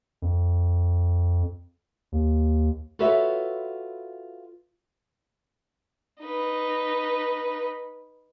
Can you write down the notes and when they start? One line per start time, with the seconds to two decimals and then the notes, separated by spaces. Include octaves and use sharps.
0.22 F2
2.12 D#2
2.99 F4 F#4 A4 B4 C#5 E5
6.23 D#4 B4